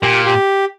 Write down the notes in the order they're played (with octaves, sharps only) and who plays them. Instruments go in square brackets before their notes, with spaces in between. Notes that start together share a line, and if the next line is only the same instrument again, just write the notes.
[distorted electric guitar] A#2 [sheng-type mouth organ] G4
[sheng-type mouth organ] G4